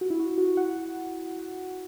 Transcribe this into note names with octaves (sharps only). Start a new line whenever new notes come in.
F#4
E4
F#4
F#4
F#4 F#5